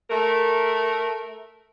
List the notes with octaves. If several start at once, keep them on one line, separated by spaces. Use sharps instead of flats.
A3 A#4